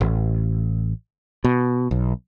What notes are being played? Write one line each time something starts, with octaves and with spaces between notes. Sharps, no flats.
A1
B2
B1